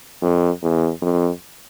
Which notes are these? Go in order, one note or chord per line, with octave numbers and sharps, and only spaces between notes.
F2
E2
F2